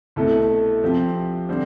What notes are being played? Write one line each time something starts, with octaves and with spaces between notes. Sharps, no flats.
C2 B2 A3 E4 A4
C3 F3 C4 G4
D3 G3 C4